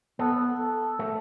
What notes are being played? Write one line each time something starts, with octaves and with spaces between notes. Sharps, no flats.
B3 A4
A4
A3